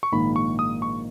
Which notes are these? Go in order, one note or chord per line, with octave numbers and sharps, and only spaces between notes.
C#6
A#1 G#2 D#3 A#3 B5
C#6
D#6
C#6